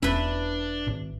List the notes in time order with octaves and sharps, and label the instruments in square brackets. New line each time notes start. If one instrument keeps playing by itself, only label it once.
[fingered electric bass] E1 E2 C#4 [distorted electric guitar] D4 [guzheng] E4 B4
[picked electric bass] G#1